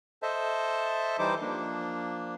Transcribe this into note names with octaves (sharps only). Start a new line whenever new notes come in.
A4 C5 D#5 E5 A5
E3 G3 D#4 C5 D6
F3 A#3 D4